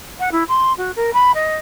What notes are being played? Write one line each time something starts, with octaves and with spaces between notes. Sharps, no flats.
F#5
E4
C6
F#4
A#4
B5
D#5